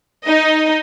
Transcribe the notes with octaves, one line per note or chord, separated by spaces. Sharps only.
D#4 D#5